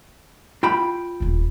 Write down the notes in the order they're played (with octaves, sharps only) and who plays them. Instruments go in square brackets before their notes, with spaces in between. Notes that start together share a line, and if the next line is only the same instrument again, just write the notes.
[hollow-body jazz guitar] F4 G5 B5
[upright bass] D#1 E2